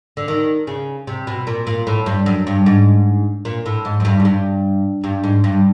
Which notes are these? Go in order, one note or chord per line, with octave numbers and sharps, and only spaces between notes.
D3
D#3
C#3
C3
B2
A#2
A#2
A2
G2
F#2
G2
G#2
A#2
A2
G#2
F#2
G2
G#2
G2
G2
G#2
G2